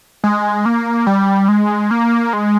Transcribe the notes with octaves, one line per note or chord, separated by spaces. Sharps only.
G#3
A#3
G3
G#3
A#3
G#3